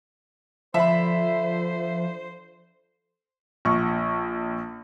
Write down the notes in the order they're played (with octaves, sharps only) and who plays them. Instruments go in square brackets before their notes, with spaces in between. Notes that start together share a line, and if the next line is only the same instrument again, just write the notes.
[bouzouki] D3 [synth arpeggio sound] F3 [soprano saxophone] C5 [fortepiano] E5 B5
[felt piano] A#1 C#6